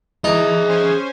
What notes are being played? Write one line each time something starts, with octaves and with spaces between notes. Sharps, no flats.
E3 D#4 G#4 E5
C#4 C5 G#5